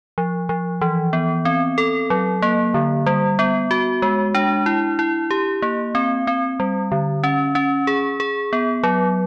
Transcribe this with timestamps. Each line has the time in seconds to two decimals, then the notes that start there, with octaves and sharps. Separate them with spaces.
0.18 F3
0.49 F3
0.81 E3
1.13 B3
1.45 C4
1.78 A4
2.10 F#3
2.42 A#3
2.74 D3
3.06 G3
3.39 B3
3.71 F#4
4.02 G#3
4.35 D4
4.66 E4
4.99 E4
5.31 G4
5.62 A#3
5.95 C4
6.27 C4
6.60 G3
6.92 D3
7.24 C#4
7.55 C#4
7.87 G#4
8.20 G#4
8.53 B3
8.84 F#3